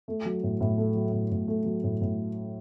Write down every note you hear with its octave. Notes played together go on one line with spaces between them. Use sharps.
A3
F#3
A2
A2
A3
F#3
A2
A2
A3
F#3
A2
A2